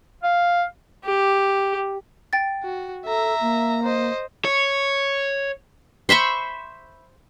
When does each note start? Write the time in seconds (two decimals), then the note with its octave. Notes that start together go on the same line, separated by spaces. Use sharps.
0.23 F5
1.05 G4
2.33 G5 A6
2.63 F#4
3.06 A4 E5 A#5
3.41 A#3
3.83 C5 D#5
4.45 C#5
6.09 C5 E5 B5 C#6